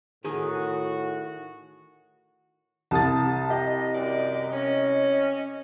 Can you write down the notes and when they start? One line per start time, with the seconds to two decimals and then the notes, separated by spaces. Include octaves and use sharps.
0.24 A2 D#3 F#4 G#4
2.91 C2 A5 D#6 A6
3.50 G4 D#5
3.93 F#2 D#3 D5
4.52 C#4